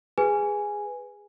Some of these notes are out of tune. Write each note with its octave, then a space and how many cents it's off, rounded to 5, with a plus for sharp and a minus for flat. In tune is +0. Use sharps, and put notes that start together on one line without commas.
G#4 -10 B4 +0 G#5 +0